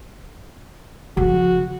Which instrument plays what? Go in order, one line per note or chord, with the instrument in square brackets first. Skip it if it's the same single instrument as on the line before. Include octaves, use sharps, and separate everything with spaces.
[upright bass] C#3 F3 [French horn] F#4